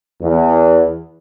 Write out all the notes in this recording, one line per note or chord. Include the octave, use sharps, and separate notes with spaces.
E2